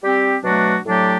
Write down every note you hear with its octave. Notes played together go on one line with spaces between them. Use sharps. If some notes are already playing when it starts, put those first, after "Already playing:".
G3 C4 G4
B2 F#3 A3 D4 F#4
A2 F#3 A3 D4 G4